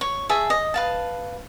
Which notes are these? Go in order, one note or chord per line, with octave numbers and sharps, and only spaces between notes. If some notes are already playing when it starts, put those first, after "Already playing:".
C#5
G#4 E5 A5
D#5
B4 F5 A5